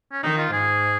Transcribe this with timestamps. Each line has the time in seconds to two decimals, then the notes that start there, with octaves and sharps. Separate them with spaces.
0.12 C#4
0.23 D#3 D#4
0.38 F4
0.52 G#2 G#4